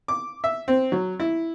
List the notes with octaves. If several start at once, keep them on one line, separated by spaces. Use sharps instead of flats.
D6
E5
C4
F#3
E4